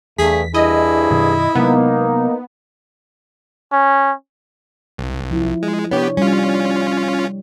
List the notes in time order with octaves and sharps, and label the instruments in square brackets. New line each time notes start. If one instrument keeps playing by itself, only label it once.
[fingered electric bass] E2 [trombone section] G2 A3 [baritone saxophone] G#4 [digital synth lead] B6
[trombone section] C2 G2 G#4 [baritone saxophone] E4 [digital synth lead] D#5
[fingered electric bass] F#2 B2 D#3
[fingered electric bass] C3 F#3 G#3 [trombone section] A#3 D#4 [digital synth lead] B3
[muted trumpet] C#4
[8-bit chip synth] C2
[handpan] F3 E4
[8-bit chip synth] G#3
[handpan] C3 D4 C#5 [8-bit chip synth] B3 G4
[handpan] G3 [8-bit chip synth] C#4 F4